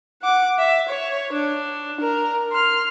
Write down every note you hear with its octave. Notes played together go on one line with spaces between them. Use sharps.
F#5 D6
E5
C#5
D4
A#4
C6 F6